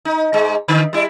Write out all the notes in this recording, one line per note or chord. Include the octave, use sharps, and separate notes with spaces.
D#4
G#2 G#3
D3
G3 E4